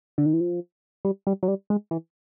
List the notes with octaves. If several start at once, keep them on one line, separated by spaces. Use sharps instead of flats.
D3
D#3
E3
F3
G3
G3
F#3
G3
G#3
E3